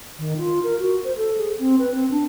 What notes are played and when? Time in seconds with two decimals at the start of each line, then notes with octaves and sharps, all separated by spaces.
0.19 D#3
0.38 F4
0.64 A#4
0.79 F#4
1.04 C5
1.17 A4
1.38 G#4
1.59 C4
1.79 B4
1.95 C4
2.11 D4